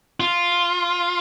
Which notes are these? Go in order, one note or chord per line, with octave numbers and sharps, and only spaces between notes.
F4